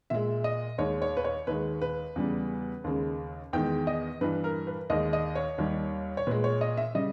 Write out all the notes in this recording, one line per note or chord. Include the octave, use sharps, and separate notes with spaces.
A#2 G#3 E5
D#5
D#2 D#3 G#3 C#5
C#5
B4
C#5
D#2 D#3 G#3 B4
B4
E2 C#3 G3
D#2 C#3 G#3
E2 D#3 G#3 G5
D#5
G2 E3 G3 B4
A#4
B4
D#2 D#3 G#3 D#5
D#5
C#5
D#2 D#3 G3
C#5
A#2 G#3 B4
C#5
D#5
E5
C#3 G3 D#5